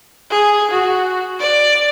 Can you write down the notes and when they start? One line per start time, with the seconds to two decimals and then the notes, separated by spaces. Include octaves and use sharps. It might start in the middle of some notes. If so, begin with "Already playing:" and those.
0.31 G#4
0.71 F#4
1.40 D5